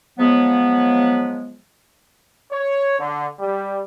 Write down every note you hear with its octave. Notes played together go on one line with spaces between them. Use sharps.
C#3 F3 F#3 G#3 B3
C#5
D3
G3